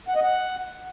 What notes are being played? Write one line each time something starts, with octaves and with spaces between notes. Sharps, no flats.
F#5
D#5
F#5